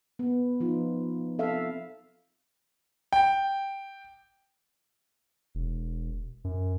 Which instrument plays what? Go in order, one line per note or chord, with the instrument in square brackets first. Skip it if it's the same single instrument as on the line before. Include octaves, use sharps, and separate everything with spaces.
[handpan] B3
F3 D#4 F4
C4 A4 E5 F5
[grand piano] G5
[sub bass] E1
F#2